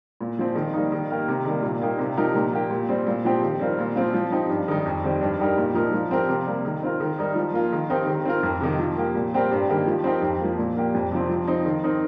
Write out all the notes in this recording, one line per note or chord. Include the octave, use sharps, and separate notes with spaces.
A#2
F3 C4
D#3
G3 A#3 D#4
D#3
A#3 G4 A#4
C3
D#3 G3 A#3
A#2
A#3 D#4 G4
C3
F3 D#4 G4 A#4
A#2
A#3 G4
A#2
G3 C4
A#2
F3 C4 G4
D#3
G3 C4 F4 A#4
A#2
F3 C4 F4
F3
C4 D#4 G4
G2
D#3 G3 D#4
F2
D#3 G3 C4 G4
G2
G3 D#4 G4 A#4
A#2
F3 D#4 A#4
F3
C4 G4 A#4
C3
G3 A#3
D#3
C4 F4 A#4
D#3
G3 D#4 A#4
F3
A#3 F4 A#4
D#3
C4 D#4 G4 A#4
D#3
C4 F4 A#4
F2
C3 D#3
F3
A#3 G4
A#2
G3 C4 G4 A#4
G2
D#3 A#3 G4
F3
C4 D#4 G4 A#4
F2
F3 A#3
A#2
A#3 G4
F2
C3 F3 C4
F3
C4 D#4
D#3
C4 D#4 A#4